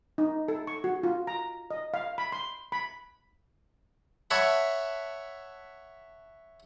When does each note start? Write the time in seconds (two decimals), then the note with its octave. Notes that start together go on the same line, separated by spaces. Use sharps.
0.18 D#4
0.48 A4
0.67 C#6
0.84 F#4
1.03 F4
1.27 A#5
1.71 D#5
1.94 F5
2.18 B5
2.32 C6
2.72 B5
4.31 C#5 E5 F#5 A5 B5